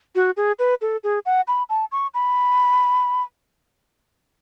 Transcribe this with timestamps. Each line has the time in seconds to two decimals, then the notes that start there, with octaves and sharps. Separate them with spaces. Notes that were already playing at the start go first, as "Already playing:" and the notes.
0.15 F#4
0.37 G#4
0.59 B4
0.82 A4
1.04 G#4
1.26 F#5
1.48 B5
1.70 A5
1.92 C#6
2.14 B5